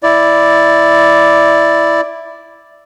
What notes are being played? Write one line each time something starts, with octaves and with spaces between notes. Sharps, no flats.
E4 D5